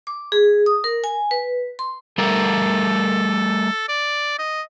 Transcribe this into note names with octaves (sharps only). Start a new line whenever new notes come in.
D6
G#4
D#6
A#4
G#5
B4
C6
G3 A3 A4 A#4
D5
D#5